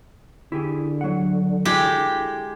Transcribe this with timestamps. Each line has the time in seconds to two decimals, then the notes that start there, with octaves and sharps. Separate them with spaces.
0.52 D3 E4 G4 G#4
1.01 F#3 F#5
1.65 G#3 E4 F#4 G4 A4